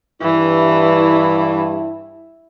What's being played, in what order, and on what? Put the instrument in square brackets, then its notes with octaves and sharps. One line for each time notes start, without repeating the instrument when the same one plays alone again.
[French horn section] G2 E4 [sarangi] E3